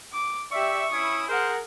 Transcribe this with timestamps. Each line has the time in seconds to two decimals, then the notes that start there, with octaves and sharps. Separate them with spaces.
0.13 D6
0.51 G4 D5 E5 C#6
0.91 C#4 E4 D#6
1.28 G#4 A#4 C5 F#5